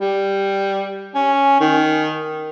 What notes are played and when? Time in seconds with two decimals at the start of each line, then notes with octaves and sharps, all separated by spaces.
0.01 G3
1.14 C#4
1.60 D#3